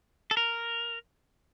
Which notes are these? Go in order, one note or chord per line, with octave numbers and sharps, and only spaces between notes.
A4
A#4